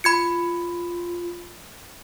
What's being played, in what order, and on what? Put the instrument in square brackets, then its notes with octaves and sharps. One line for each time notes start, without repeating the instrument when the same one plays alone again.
[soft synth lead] F4 [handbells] B5 G#6 C#7